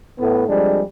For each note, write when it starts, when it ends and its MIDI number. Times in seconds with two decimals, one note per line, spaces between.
0.19 0.45 45
0.19 0.45 59
0.48 0.81 41
0.48 0.81 55
0.48 0.81 56
0.48 0.81 62